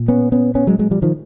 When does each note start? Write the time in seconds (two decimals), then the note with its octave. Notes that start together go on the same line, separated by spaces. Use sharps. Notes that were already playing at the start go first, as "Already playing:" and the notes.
Already playing: A#2
0.08 B3 C#4
0.32 B3 C#4
0.55 B3 C#4
0.67 F#3 G#3
0.79 F#3 G#3
0.91 F3 G3
1.02 D#3 F3